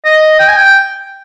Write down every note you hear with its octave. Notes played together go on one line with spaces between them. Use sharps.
D#5
G5
G#5
G5